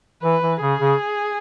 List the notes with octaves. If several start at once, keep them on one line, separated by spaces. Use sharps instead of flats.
E3 B4
E3
C#3 G#4
C#3